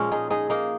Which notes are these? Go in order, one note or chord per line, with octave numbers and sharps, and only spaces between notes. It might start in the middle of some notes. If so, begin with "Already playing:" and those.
Already playing: A#2 F3 G#3 C#4
D#4 G#4
D#4 G#4
A#3 D#4